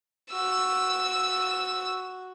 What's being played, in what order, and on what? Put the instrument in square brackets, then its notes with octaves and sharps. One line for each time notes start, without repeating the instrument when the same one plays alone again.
[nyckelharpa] F#4 [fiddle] E6